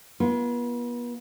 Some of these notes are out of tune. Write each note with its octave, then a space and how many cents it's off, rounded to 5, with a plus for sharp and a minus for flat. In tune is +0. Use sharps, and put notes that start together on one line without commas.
B3 -40 F4 -30